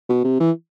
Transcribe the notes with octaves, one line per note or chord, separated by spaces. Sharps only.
B2
C3
E3